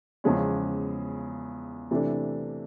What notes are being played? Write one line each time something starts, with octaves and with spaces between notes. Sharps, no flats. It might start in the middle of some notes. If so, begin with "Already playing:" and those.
E2 C#3 F3 G#3 C#4
C3 E3 A3 D4